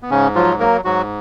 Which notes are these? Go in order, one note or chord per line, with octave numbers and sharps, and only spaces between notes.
B3
G#2 C#3 C#4
F3 F#3 F4
F#3 A#3 A#4
G#2 F#3 F#4